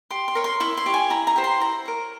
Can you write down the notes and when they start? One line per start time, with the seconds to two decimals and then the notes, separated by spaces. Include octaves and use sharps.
0.10 G4 C6
0.28 C6
0.35 A#4 C#5
0.44 C6
0.60 E4 C#6
0.77 C6
0.86 G4 C#5
0.94 G#5
1.10 E4 A#5
1.27 A#5
1.36 G4 C5
1.44 C6
1.60 E4 A#5
1.85 A#4 C#5